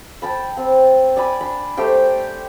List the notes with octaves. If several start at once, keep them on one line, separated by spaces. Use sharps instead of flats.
G5 A5 B5
C4
D5 G#5 B5
D4 B5
A3 G4 C5 G5